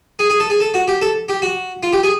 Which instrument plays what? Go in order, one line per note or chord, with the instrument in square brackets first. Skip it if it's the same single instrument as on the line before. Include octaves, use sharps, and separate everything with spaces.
[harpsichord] G#4
G#4
A4
G#4
A4
F#4
G4
A4
G4
F#4
F4
G4
G#4